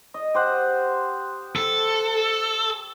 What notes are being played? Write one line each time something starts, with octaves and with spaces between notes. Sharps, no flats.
D#5
G4 C5 F#5
A4